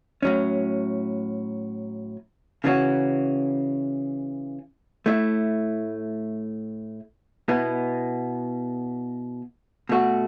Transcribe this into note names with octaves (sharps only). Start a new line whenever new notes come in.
A2 F#3 C#4
C#3 E3 C#4 F#4
A2 A3 E4
B2 B3 E4
B2 A3 F#4